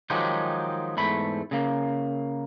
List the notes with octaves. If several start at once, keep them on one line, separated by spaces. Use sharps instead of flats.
D#3 F3 F#3 G#3 D#4 G4
E2 G#2 A3 B5
C#3 A#3